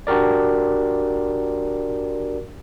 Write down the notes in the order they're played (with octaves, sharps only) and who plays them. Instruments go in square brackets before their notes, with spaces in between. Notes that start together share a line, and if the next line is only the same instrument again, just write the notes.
[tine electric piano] D4 F#4 G4 A#4 D5